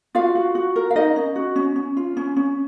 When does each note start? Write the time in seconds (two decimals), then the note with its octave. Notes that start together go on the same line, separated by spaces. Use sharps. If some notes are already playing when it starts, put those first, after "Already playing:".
0.15 F4 F#4 F5
0.35 F#4
0.55 F#4
0.76 A#4
0.90 F5
0.96 D#4 A#4 D#5
1.16 C#4
1.36 F#4
1.56 C#4
1.76 C#4
1.97 F4
2.17 C#4
2.36 C#4